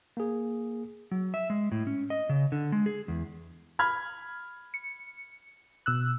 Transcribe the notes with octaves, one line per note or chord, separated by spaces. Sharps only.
A#3 G#4
F#3
E5
G#3
A2
C#4
D#5
C#3
D3
G#3
G#4
E2
B5 F6 G#6
C#7
B2 E6 F#6